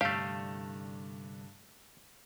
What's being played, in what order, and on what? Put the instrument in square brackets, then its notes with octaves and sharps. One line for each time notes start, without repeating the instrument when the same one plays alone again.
[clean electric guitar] C2 D3 [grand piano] G2 [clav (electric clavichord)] A3 G4 [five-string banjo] F5